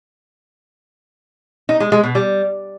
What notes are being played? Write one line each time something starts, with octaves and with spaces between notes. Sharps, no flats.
D#4
G#3
G#3
B2
G3